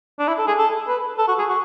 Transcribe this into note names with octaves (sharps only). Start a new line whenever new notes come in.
D4
E4
A4
G#4
A4
B4
A4
F#4
G#4
F#4